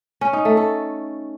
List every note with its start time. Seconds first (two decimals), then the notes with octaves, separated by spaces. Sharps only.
0.21 C#4
0.33 D#4
0.45 A3
0.57 A4